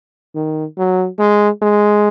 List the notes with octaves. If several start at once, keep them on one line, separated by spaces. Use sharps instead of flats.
D#3
F#3
G#3
G#3